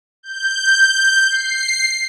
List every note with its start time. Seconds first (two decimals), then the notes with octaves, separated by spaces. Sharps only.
0.23 G6
1.30 C7